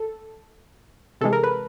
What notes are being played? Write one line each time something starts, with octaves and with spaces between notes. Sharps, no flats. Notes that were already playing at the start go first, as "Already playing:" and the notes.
Already playing: A4
C3 E3 G#3 A4
A#4
B4